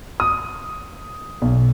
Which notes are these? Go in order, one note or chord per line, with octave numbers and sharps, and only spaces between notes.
D#6
B1